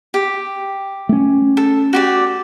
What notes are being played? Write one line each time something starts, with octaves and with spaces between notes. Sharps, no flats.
G4
A3 C#4
A4
F#4 G4 D5